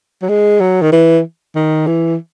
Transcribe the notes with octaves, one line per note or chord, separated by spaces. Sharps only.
F#3
G#3
F#3
D#3
E3
D#3
E3